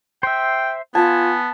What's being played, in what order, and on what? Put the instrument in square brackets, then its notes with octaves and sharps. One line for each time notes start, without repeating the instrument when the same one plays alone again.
[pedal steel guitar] C5 E5 [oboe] G5
[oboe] B3 [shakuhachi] F4 [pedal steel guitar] G#5 [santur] A5